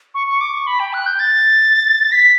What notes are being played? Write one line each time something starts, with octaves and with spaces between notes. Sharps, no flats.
C#6
C#6
D6
C#6
B5
G5
F#6
G6
A6
B6